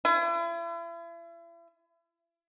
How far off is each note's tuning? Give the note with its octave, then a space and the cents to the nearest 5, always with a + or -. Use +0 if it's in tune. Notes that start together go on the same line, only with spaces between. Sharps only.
E4 +40